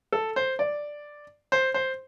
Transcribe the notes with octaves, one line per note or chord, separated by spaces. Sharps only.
A4
C5
D5
C5
C5